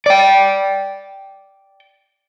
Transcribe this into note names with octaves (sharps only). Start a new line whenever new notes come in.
D5 G5